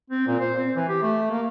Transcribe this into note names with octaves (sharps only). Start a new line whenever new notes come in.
C4
A#2
C5
C4
E3
G4
A3
A#3